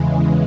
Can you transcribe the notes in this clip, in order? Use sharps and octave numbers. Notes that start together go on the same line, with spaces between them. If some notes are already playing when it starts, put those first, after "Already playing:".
Already playing: E2 C#3 E3 G#3